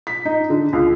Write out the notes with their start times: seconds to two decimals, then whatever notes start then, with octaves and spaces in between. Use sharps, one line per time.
0.07 B6
0.25 D#4
0.50 D3
0.73 C#2